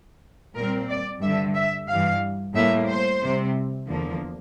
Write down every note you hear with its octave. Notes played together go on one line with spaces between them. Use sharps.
A#2 G3 C4 A#4
D5
G2 D3 G3 E5
E5
G2 E3 G3 F5
A2 G3 A#3 E5
C5
C3 G3 C4
E2 D3 F3 A#3